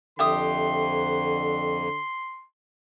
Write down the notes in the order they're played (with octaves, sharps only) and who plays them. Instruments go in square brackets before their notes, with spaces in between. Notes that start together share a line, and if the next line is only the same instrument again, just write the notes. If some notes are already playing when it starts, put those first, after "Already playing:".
[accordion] F2 [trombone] D3 [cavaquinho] G4 E5 D#6 [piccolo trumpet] C6